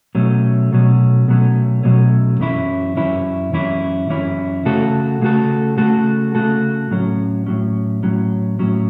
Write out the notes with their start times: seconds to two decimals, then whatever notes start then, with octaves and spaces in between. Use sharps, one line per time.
0.15 B1 B2 F#3 A3 C#4
0.72 B1 B2 F#3 A3 C#4
1.28 B1 B2 F#3 A3 C#4
1.83 B1 B2 F#3 A3 C#4
2.40 F#2 E3 C#4 E4
2.97 F#2 E3 C#4 E4
3.53 F#2 E3 C#4 E4
4.09 F#2 E3 C#4 E4
4.65 C#3 A3 F#4 A4
5.22 C#3 A3 F#4 A4
5.78 C#3 A3 F#4 A4
6.35 C#3 A3 F#4 A4
6.91 A2 F#3 C#4
7.47 A2 F#3 C#4
8.03 A2 F#3 C#4
8.59 A2 F#3 C#4